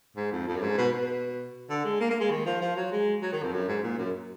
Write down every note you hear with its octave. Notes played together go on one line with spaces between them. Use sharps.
G#2
F2
F2
F#2
G#2
B2
B2
D3
G#3
A#3
A#3
G#3
D#3
F3
F3
F#3
G#3
F#3
D#3
F2
F#2
G#2
A#2
F#2